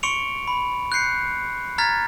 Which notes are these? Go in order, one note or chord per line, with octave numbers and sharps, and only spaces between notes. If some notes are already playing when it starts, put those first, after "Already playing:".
C6 C#6 C#7 D7 F7
B5
F#6 G6 C7 C#7
A#5 F6 G#6 A6 B6